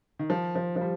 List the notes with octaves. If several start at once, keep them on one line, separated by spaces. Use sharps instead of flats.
D#3
F3
F3
F3
G3